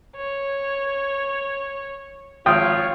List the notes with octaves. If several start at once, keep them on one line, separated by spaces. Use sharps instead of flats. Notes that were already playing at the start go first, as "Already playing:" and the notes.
C#5
G#1 F4 C#5 G5 D#6